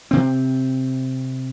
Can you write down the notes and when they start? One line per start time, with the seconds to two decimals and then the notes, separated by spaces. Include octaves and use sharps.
0.11 C3 C4